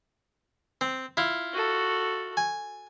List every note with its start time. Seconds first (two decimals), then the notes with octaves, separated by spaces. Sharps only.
0.81 C4
1.17 E4 F4
1.53 F#4 A4
2.37 G#5